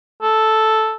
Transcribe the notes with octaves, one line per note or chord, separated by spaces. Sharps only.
A4